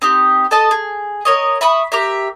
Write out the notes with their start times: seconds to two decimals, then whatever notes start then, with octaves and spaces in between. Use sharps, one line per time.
0.02 C4 D#4 G4
0.51 A4 D#5 A5
0.71 G#4
1.25 A#4 C#5 D#5
1.61 E5 B5 C#6 D#6
1.92 G4 A#4 E5